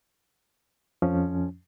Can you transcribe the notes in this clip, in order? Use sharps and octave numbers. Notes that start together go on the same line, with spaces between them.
F2 F3 C#4